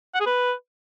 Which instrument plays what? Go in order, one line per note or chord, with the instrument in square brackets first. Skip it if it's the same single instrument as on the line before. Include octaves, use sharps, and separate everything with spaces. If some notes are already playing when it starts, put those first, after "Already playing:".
[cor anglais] F#5
G#4
B4